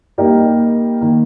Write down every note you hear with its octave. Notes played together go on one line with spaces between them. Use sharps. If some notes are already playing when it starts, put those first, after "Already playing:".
G3 A#3 D#4 G4 A#4
D#3 A#3